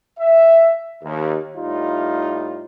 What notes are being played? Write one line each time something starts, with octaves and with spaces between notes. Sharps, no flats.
E5
D#2
A2 G3 D#4 F4